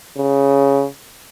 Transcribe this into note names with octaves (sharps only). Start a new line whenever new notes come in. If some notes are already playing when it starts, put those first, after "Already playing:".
C#3